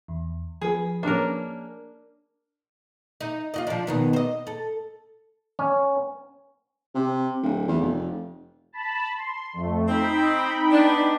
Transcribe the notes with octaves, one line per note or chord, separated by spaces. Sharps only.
E2
F3 G#4 B4
A#3 C#4 D4 A#4
D#4
F4 F#4 D#5
F3 D4
B2 D#3 B3
C5 D#5
A4
C#4
C3
D1
E2
F1
A5 B5
C6
F2 A3
C4 D#4 G5 B5
B3 D4